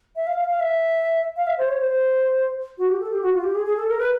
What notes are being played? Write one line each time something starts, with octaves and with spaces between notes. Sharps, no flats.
E5
F5
F5
F5
E5
F5
E5
C5
C#5
C5
F#4
G4
A4
G4
F#4
F4
G4
G#4
G#4
A4
A#4
B4